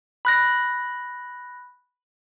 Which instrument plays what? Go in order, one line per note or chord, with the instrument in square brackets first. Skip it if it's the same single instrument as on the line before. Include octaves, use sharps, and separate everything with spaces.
[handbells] B5 F#6 A#6